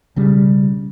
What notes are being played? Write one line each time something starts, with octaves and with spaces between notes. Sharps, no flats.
B1 C#3 G3